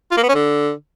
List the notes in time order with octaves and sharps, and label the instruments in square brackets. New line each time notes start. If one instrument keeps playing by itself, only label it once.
[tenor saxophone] F4
A#3
B3
C#4
D3